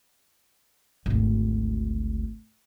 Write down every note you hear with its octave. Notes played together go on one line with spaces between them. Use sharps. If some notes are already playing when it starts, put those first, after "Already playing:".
G#1 D2